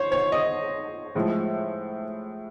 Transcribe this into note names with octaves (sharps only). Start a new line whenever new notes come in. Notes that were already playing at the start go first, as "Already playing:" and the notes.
Already playing: C5 C#5
C#5
D#5
A2 F3 G#3